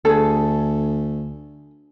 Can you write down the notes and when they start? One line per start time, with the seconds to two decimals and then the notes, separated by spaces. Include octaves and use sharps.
0.05 D2 G#4 A4